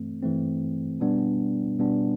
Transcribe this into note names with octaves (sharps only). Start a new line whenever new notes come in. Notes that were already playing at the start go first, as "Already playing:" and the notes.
Already playing: G2 E3 A3 C4
G2 E3 A3 C4
B2 G3 B3 D4
B2 G3 B3 D4